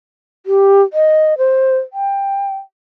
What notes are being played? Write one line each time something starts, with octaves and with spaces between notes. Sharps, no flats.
G4
D#5
C5
G5